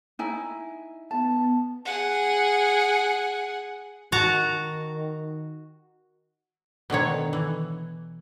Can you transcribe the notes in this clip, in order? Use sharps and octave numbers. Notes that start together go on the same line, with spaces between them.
D#4 E4 G#5
B3 A5
G#4 F#5
D#3 F#4 A5 A#5
B2 D3 D#3 C#5
E3